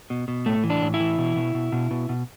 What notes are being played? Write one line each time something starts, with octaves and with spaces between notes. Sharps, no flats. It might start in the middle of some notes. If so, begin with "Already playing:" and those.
B2
B2
A2 A3
E3
D4
A2
E4
E3
B2
B2
B2
B2
B2
B2